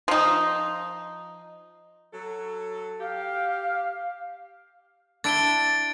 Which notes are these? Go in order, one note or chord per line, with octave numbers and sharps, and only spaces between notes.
F3 D#4
F#3 A4
G4 F5
D4 E4 A6 D7 G7